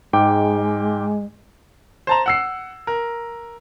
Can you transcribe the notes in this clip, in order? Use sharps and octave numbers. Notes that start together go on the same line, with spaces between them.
G#2 G#3 G5 D6
C5 A5 A#5
F#5 E6 C7
A#4